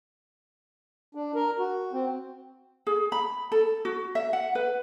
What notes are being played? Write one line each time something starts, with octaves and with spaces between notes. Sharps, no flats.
D4
A#4
F#4
C4
G#4
B5
A4
F#4
E5
F#5
B4